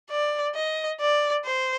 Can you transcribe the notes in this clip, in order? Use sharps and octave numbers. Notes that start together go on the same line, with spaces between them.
D5
D#5
D5
C5